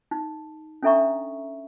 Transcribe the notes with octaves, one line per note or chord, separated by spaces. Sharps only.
D#4
C#4 D4 A4 E5 A#5 C#6